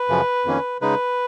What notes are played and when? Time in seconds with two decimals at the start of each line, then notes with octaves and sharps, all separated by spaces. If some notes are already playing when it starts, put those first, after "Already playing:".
Already playing: B4
0.09 F#2 C#3 F3
0.45 F2 D#3 A#3 C#4
0.81 C#3 G#3 D#4 B4